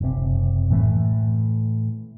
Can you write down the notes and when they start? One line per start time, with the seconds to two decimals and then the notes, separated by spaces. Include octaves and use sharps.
0.01 F#1 C3
0.70 A2 E3 A3